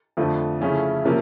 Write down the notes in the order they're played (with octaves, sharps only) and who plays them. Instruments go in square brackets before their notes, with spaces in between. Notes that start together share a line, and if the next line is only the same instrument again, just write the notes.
[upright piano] F2 D3 F3 A3
C#3 F3 A3 C#4 E4
C3 F3 A#3 C#4